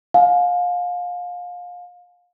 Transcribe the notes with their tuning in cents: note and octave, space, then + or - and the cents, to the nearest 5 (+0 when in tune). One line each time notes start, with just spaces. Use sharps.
F5 +30 G#5 +35